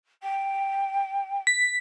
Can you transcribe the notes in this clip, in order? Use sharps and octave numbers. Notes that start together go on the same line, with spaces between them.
G5
B6